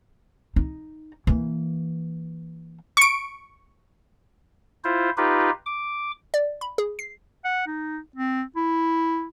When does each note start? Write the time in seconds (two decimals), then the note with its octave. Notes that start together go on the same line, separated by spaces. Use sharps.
0.56 D#4
1.27 E3 A#3
2.97 C#6 D7
4.84 E4 F4 C5
5.17 D#4 F4 G4 B4
5.66 D6
6.34 D5
6.61 B5
6.78 G#4
6.99 C7
7.45 F#5
7.67 D#4
8.16 C4
8.56 E4